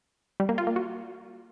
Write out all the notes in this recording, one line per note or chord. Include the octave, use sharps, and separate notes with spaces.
G3
A#3
F4
A#3
F#4